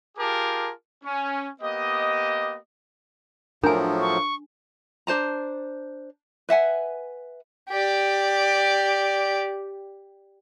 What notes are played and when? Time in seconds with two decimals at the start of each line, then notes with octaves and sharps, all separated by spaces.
0.18 F4 G4 G#4 A#4 A5 D6
1.04 C#4
1.61 A#3 B3 G4 D#5
3.64 A2 F3 F#3 D4 A#4 G#5
4.01 C#6
5.07 D4 C5 A5 A#5
6.49 B4 E5 F#5 G#5
7.70 G4 D5